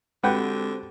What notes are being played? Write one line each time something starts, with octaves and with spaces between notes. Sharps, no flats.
D3 G#3 C4 F#4 G4 B4 F#5 G5